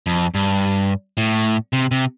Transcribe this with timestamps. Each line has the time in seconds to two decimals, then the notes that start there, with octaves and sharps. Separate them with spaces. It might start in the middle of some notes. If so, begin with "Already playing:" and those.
0.07 F2
0.35 G2
1.17 A2
1.73 C3
1.91 C3